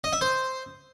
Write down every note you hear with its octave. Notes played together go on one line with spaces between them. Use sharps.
D#5
E5
C5